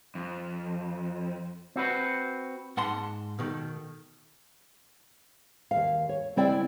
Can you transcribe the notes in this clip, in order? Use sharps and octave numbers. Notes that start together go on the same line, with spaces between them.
F2
C4 F#4 B4
G#2 F#5 A5 C6
B2 D#3 A3
D#2 F5
C#5
C#3 C4 E4 D5 G5